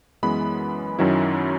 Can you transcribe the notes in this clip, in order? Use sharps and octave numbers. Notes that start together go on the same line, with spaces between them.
F#2 E3 G#3 B3 B5
F#2 D#3 F#3 C#4 E4